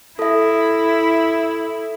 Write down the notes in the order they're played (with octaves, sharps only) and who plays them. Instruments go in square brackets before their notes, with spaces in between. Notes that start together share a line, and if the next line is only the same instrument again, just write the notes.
[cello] E4 [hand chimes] A4 E5